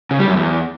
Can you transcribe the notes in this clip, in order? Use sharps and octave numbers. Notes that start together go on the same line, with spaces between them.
C#3
G3
F#2
E2